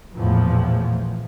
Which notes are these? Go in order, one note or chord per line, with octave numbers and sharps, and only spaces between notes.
A#1 E2 A2 E3 F3